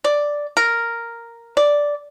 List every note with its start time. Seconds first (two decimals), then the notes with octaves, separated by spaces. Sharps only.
0.04 D5
0.57 A#4
1.57 D5